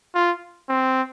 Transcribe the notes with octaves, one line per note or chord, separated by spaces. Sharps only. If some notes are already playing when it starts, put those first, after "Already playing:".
F4
C4